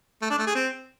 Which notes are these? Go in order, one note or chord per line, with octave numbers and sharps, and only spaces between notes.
A3
D4
A3
G#4
C4